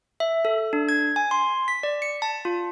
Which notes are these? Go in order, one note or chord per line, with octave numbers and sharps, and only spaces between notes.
E5
A4
D4
G#6
G#5
C6
B6
D5
C#7
A5
F4